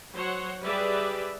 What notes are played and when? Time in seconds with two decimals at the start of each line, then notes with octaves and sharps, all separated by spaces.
0.14 F#3 C5 C#5 F#5
0.62 G3 G4 G#4 B4 D5 E5